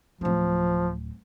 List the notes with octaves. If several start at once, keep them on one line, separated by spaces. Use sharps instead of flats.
D1 F3 C4